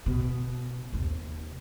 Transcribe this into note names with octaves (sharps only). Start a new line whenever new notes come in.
B2
D#2 C3